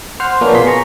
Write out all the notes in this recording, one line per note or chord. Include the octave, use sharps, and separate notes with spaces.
C5 F#5 F6
F3 A#3 B3 C#4 D4
B2 G#4 C6 B6
A#5 C#6